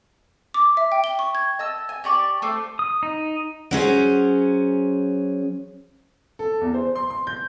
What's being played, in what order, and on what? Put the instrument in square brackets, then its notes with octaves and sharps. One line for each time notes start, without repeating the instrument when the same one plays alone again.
[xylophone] D6
E5
G5
G7
C#6
G#6
[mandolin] D#5 A5 E6
G#5
G4 D5 C#6
A3 C5 D6
[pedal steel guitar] D#6
D#4
[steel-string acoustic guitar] F#3 C#4 G#4 C5
[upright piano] A4
E2
C5
C6
C6
G6